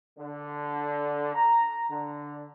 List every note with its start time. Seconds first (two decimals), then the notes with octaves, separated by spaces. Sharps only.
0.18 D3
1.34 A#5
1.89 D3